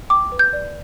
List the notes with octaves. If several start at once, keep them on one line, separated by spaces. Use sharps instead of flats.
G5 D6
B4
G6
D5